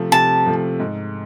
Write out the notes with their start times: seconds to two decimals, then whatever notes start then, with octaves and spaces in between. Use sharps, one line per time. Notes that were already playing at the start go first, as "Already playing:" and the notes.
Already playing: C3 F3 A3
0.12 C3 A5
0.46 F3 A3
0.80 G#2